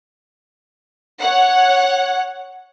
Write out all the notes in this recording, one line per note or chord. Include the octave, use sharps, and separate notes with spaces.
C#5 F#5